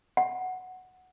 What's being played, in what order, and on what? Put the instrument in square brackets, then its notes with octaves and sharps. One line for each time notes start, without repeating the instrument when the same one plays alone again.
[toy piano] F#5